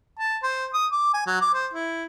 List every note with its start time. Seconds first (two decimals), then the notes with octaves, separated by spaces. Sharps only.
0.19 A5
0.43 C5
0.74 D#6
0.92 D6
1.14 G#5
1.27 F#3
1.41 D6
1.54 C5
1.74 E4